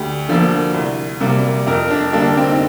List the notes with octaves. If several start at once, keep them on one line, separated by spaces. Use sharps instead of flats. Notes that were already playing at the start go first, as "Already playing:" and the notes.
Already playing: D2 G4
D3 F3 A#3
C2
C3 G3 A#3
F2 A#4
D4
D3 G3 A#3 D4
C4
D#4